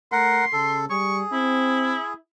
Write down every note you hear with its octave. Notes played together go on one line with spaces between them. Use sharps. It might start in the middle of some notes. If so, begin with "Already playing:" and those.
A3 A#4 F#5 C6
C#3 A4
G3 G#4 C#6
C4 E4